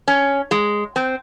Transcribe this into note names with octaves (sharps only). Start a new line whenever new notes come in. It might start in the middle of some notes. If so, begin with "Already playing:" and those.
C#4
G#3
C4